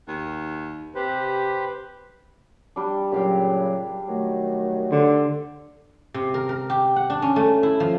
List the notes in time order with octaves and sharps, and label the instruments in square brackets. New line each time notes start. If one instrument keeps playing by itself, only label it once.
[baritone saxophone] D#2
[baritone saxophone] C3 [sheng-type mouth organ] G4 B4 C5
[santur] G3 D4
[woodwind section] A#2 C#3 F#3 [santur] G4 F5 G5
[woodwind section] D#3 F#3 A3
[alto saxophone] D3 [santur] C5
[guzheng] C3
A#4
A#4
G4
F#5
D4
C#4
A3
E4
F3